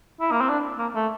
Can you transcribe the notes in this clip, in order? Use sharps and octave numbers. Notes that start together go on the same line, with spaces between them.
E4
A#3
C4
D4
A#3
A3